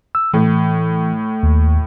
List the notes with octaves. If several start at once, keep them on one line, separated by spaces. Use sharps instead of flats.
E6
A2 E3
D#2